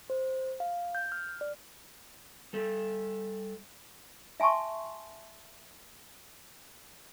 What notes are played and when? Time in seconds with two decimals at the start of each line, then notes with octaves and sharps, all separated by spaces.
0.10 C5
0.60 F5
0.95 G6
1.12 F6
1.41 D5
2.53 G3 A4
4.40 E5 G#5 A5 C6 C#6